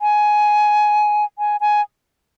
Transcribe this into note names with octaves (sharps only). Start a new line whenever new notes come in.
G#5
G#5
G#5